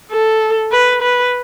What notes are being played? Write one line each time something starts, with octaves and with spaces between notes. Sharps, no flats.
A4
B4
B4